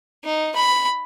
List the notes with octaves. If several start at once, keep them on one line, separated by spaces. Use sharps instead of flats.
D#4
B5